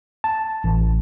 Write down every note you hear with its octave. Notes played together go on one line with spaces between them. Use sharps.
A5
A1